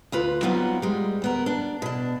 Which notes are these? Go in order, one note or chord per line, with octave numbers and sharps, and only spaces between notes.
D2 F4 B4
F#3 G3 B3 C4 D#4 F4
G3 G#3
D2 B3 A#4
D4
B2 D4